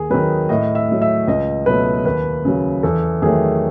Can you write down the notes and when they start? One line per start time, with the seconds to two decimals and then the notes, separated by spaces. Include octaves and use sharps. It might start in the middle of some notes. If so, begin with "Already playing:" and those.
Already playing: D#2 G#4
0.10 D#3 F#3 B4
0.49 A2 D#5
0.75 E5
0.89 F#3 A3
1.02 E5
1.27 C#2 D#5
1.66 B2 F#3 A3 B4
2.05 D#2 B4
2.45 C#3 F#3
2.83 E2 A4
3.22 D#3 F#3 A3 G#4